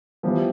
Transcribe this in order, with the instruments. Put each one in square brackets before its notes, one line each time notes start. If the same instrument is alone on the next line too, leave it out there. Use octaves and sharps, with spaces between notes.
[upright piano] E3 G3 B3 [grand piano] F3